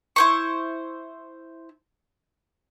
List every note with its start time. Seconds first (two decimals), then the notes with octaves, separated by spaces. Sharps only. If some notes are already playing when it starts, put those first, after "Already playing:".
0.16 E4 C5 C#6